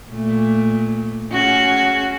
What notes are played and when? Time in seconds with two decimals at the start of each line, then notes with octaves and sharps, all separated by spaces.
0.11 A#2 A3
1.32 C#4 F#4 G#4